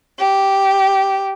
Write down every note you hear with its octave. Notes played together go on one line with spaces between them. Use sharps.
G4